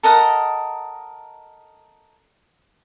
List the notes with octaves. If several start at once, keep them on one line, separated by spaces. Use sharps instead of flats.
A4 A#4 D#5 F#5